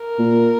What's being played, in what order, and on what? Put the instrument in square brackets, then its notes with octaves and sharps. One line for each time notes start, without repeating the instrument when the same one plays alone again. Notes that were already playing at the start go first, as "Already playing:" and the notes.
Already playing: [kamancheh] A#4
[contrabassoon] A#2